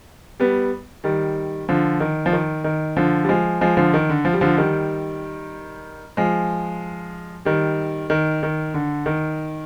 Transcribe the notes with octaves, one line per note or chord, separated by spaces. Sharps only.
G3 B3
D#3 G3
D3 F3
D#3
F3
D#3
D#3
D3 F3
G3
F3 G#3
F3 G#3
D3 F3
D#3
D3
F3
G3
D3 F3
D#3 G3
F3 G#3
D#3 G3
D#3
D#3
D3
D#3